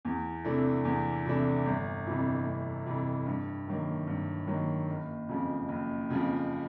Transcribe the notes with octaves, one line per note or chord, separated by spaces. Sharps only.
E2
C3 E3 A3 D4
E2
C3 E3 A3 D4
G1
F2 C3 E3
G1
F2 C3 E3
G2
D#3 F#3 A#3
G2
D#3 F#3 A#3
F#1
F2 C#3 F3
F#1
F2 C#3 F3